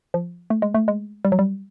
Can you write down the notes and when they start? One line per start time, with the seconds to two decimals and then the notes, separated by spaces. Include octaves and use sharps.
0.14 F3
0.50 A3
0.62 G#3
0.74 A3
0.88 G#3
1.25 G3
1.32 F#3
1.39 G3